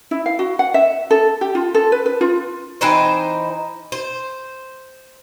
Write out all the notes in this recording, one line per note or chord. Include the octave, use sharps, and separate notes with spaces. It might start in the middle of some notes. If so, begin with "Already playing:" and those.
E4
F5
F#4
F#5
E5
A4
G4
F4
A4
B4
B4
F4
E3 C4 D#4 C5
C5